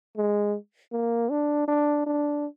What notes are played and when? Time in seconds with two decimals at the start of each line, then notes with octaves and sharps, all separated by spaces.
0.17 G#3
0.92 A#3
1.31 D4
1.68 D4
2.06 D4